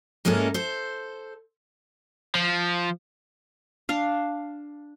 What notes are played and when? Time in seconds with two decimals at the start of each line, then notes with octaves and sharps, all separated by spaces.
0.25 G#2 G#3 A#3 C#4 E4 A4
0.54 A4 C5
2.35 F3
3.89 D4 F5